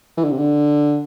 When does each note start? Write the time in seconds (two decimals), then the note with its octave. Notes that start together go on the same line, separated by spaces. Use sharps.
0.17 E3
0.24 D3
0.31 C3
0.38 D3